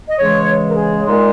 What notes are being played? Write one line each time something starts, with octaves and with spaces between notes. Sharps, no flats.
D#5
C#3 E3 G#3 C#5
A#4
G#4
A#2 G#3 D#4